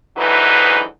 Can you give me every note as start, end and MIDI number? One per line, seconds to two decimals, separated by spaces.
0.17 0.82 38
0.17 0.82 44
0.17 0.82 52
0.17 0.82 54
0.17 0.82 63
0.17 0.82 71